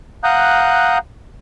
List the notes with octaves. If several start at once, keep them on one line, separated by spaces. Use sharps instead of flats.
F5 F#5 A#5 D#6 F#6 G6